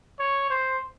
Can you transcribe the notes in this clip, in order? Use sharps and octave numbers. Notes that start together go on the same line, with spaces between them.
C#5
C5